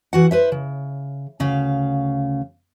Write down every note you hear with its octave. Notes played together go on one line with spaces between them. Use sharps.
E3 F#4 F#5
B4 C5 E5
C#3
D2 C#3 F5